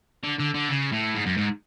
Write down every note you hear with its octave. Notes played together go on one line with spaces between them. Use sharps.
D3
D3
D3
C#3
A2
G#2
F#2
G#2